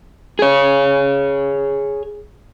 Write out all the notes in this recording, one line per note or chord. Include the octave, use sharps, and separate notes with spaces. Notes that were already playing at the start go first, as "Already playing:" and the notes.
G#4 C#5